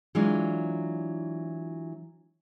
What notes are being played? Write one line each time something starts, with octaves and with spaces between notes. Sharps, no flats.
E3 F#3 G#3 D4 F4